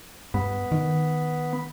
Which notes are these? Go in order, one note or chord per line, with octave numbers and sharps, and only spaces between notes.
G2 B3
D#3